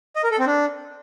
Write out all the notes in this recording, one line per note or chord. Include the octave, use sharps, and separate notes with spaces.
D#5
A#4
A4
C4
D4